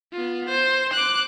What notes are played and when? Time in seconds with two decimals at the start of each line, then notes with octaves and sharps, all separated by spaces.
0.12 B3 F4
0.49 C5
0.93 D6 F#6